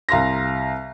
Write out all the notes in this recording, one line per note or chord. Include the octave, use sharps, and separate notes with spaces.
C2 F5 A#5 C6 A#6